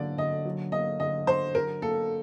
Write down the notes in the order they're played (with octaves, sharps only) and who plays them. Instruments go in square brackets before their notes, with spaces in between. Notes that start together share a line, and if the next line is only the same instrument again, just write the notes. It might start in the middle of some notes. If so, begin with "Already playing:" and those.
Already playing: [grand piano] D3 F#3 A#3 [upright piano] D5
[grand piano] D3 [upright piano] D#5
[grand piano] F#3
[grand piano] A#3 [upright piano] D#5
[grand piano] D3 [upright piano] D#5
[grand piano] D3 [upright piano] C5
[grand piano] F#3 [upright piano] A#4
[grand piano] A#3 [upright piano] A4